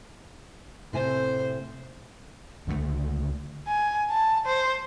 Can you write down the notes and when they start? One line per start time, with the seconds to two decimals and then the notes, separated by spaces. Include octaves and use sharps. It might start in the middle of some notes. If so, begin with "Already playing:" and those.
0.93 A2 C3 C5 G#5
2.67 C#2 D3 F#3 A3
3.67 G#5
4.10 A5
4.46 C5